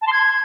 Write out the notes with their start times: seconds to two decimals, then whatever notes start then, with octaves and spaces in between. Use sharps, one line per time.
0.02 A5
0.07 C6
0.13 G#6